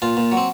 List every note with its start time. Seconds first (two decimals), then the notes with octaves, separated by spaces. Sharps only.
0.02 A#2 F4
0.17 A#2
0.32 F#3
0.37 C4